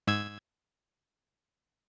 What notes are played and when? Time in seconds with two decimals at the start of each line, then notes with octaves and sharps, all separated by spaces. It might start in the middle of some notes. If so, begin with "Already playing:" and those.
0.07 G#2 E6 G#6